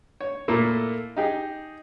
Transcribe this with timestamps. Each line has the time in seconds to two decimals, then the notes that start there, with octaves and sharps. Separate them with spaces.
0.21 C#5
0.48 A#2 A3 A#3 E4 A4
1.17 D#4 G4 G#4